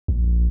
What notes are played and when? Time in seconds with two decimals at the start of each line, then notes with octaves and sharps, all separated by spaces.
0.08 A#1